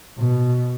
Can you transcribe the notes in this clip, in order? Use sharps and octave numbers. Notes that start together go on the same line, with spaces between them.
B2